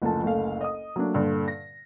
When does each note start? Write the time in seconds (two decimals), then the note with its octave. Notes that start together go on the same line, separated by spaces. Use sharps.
0.02 F#1 D2 F3 A5
0.23 F#1 D2 A4 F5
0.61 D#5 D#6
0.96 F#3 A3 A#3 D4
1.14 G2 A#2 D3
1.48 A#6